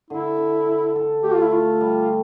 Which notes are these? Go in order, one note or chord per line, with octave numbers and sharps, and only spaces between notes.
D3 E4
D3
A4
A4
A3 G4
F4
E4
A3 F4
G3